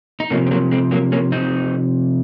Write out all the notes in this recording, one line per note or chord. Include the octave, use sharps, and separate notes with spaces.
D#4
C3 F3 A#3 C#4
C4
F#3 A#3
G#3 C4
F#3 A#3
A#3 C#4
C4 D#4